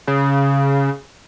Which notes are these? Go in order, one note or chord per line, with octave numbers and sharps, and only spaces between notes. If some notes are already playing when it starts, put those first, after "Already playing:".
C#3